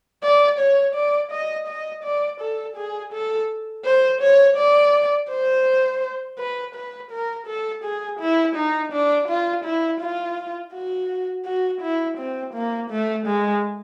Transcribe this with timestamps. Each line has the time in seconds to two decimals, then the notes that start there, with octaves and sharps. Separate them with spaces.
0.23 D5
0.59 C#5
0.95 D5
1.32 D#5
1.67 D#5
2.04 D5
2.41 A4
2.77 G#4
3.13 A4
3.85 C5
4.21 C#5
4.57 D5
5.30 C5
6.39 B4
6.75 B4
7.11 A#4
7.47 A4
7.84 G#4
8.20 E4
8.56 D#4
8.92 D4
9.28 F4
9.65 E4
10.00 F4
10.74 F#4
11.46 F#4
11.81 E4
12.18 C4
12.54 A#3
12.90 A3
13.26 G#3